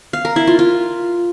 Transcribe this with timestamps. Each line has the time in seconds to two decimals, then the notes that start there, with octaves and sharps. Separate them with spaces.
0.13 F5
0.25 A#4
0.36 E4
0.47 F4
0.59 F4